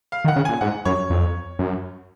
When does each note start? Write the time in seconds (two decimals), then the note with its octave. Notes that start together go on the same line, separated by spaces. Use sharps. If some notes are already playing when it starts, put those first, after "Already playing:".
0.12 F5
0.24 D#3
0.28 F#5
0.36 C#3
0.45 A#2 G#5
0.61 G#2 F#5
0.85 F#2 C#5
1.10 F2
1.59 F#2